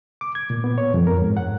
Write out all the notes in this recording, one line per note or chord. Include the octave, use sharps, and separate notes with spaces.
D6
G#6
A#2
B3
C#5
F2
A#4
G#2
F#5